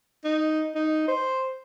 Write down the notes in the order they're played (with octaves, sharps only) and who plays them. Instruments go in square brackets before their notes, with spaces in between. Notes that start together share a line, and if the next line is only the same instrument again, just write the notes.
[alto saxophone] D#4
D#4
C5